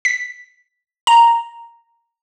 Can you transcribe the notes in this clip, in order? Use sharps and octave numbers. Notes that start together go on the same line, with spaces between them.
B6
A#5